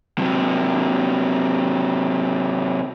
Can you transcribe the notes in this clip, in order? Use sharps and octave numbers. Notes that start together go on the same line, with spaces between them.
C3 F#3